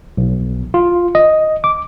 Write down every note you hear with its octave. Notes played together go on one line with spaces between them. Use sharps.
B1
F4
D#5
D6